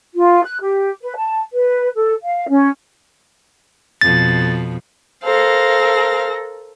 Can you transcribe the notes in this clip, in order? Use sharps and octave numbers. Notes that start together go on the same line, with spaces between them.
F4
F#6
G4
B4
A5
B4
A4
F5
C#4
F2 B2 A6
A4 A#4 C5 F5 A#6